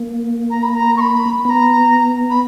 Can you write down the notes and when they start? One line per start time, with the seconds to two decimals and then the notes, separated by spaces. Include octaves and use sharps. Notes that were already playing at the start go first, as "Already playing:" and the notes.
Already playing: A#3
0.50 A#5
0.62 B5
0.74 A#5
0.97 C#6
1.00 B5
1.44 B3 A#5 B5
2.30 B5